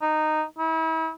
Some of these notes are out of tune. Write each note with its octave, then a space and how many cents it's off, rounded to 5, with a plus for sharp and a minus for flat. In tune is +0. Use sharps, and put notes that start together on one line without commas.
D#4 -10
E4 -40